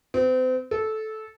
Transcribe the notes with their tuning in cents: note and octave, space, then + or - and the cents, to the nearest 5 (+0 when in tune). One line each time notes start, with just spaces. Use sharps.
C4 -35
A4 -15